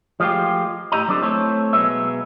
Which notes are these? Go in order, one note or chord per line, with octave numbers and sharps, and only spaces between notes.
F3 G#3 A3 F4 G4
A2 E4 G4 D#5 A#5
F#3 G3 C4 D4 A4 C5
A3 C4 E4 A4 C5 C#5
B1 F#2 F#3 G#3 B3 E5